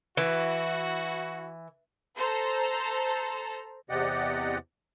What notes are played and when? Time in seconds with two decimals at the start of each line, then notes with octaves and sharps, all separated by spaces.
0.17 E3 E4 F#4
2.17 A4 C5 A#5
3.90 E2 C3 G4 D5 D#5 F#5